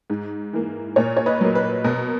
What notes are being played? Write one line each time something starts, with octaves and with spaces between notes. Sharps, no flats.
G#2
E3 A#3
A#2 A#4 C#5
C#5
B4 D#5
F#3 A#3
B4
B2 A#4